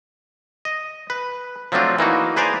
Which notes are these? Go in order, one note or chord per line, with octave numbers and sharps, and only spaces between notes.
D#5
B4
F3 F#3 A3 C4 D4 F4
E3 A#3 D#4 F#4
G#4 B4 C5 D5 G#5 A#5